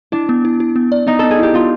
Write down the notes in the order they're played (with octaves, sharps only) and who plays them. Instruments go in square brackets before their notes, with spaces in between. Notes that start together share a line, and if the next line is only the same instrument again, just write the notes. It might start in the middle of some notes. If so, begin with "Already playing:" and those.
[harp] D4 [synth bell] E4
[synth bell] B3
E4
E4
B3
D5
[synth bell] B3 [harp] D#4
[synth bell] B3 [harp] A4
[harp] G#4
[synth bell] E4 [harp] G4
[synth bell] B3 [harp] F4